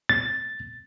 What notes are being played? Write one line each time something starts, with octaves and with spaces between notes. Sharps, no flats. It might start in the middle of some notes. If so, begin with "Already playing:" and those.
A6